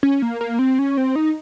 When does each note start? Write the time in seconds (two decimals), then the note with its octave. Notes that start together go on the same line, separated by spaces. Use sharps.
0.03 C#4
0.22 A#3
0.41 A#3
0.59 C4
0.79 C#4
0.97 C4
1.16 D#4